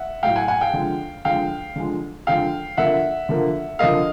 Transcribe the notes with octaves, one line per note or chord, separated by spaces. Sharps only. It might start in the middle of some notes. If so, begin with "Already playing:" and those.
Already playing: E5 F#5
A2 F#3 A3 F5 G5
F#5 G#5
F#5 G#5
F5 G5
D3 F3 G#3
D3 F3 G#3 F5 G5
D3 F3 G#3
D3 F3 G#3 F5 G5
D3 F3 A#3 E5 F#5
D3 F3 A#3
D3 F3 A#3 D#5 F5